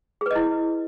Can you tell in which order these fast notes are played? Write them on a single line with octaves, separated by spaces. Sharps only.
G#4 B4 D#5 E4